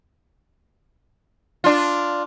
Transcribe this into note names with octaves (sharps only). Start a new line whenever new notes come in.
D4 F4